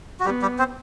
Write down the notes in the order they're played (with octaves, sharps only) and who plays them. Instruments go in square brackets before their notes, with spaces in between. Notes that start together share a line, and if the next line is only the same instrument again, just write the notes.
[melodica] F#4
[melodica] G3 G4 [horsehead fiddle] B3
[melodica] G3 G4
C4 C5